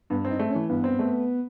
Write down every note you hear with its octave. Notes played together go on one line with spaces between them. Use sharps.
G2 B3
C4
D#4
A3
C#4
E3
G2 B3
C4
A3